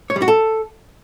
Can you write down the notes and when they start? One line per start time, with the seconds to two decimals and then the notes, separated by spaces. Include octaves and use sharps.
0.10 C#5
0.16 G3
0.22 F#4
0.28 A4